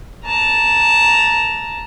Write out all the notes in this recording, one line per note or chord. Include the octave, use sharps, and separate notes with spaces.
A5 A#5